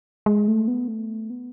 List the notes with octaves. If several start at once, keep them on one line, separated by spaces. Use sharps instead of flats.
G#3
A3
B3
A3
B3